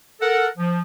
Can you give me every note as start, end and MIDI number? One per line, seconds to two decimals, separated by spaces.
0.21 0.47 69
0.21 0.47 70
0.21 0.47 78
0.57 0.81 53